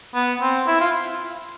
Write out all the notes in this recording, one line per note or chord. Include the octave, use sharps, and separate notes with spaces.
B3
C4
E4
F4